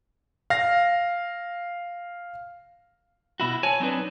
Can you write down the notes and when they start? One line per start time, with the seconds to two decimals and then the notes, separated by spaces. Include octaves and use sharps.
0.50 F5 A#6
3.40 B2 E4 F#4
3.63 C#5 G#5 A5
3.80 F#3 C4 D4 D#4 B4